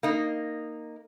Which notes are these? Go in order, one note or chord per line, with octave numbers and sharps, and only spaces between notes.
A#3 D#4